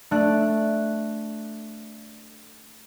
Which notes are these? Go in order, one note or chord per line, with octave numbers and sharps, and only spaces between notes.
A3 D4 F#6